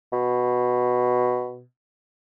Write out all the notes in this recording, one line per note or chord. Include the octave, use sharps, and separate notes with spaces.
B2